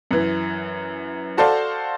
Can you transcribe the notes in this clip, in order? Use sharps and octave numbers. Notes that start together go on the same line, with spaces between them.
F#2 E3
F#4 A4 C5 D5 F5 A5